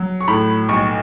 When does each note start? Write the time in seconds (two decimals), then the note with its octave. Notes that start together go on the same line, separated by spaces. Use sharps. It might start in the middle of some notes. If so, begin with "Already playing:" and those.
Already playing: F#3
0.21 C#6
0.28 A2 B5
0.69 B1 C#6